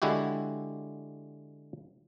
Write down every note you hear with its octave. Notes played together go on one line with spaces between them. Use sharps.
D3 G#3 E4 F#4 G4